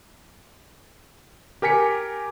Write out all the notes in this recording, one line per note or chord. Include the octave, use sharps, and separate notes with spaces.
G4 A#4 G#5 B6 C#7